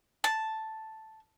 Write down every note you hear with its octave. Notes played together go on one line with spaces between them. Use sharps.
A5